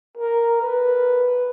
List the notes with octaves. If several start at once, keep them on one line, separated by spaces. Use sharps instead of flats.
A#4
B4